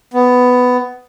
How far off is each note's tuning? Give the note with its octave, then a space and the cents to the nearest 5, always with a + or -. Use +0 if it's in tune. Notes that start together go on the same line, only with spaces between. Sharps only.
B3 +10